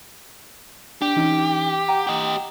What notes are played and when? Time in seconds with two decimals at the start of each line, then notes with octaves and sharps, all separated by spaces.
1.02 D4 G4
1.16 E3 C#4 D#4
1.88 F#5 G5 A#5
2.07 G4 D#5